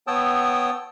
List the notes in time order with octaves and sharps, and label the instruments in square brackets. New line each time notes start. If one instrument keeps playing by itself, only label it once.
[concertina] B3 C#5 G5 A5 D#6 E6